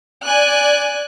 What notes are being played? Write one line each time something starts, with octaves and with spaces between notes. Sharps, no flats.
D5 G#5 F#6